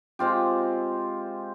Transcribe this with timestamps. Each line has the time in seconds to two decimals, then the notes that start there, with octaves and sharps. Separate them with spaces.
0.19 G#3 C4 F4 G4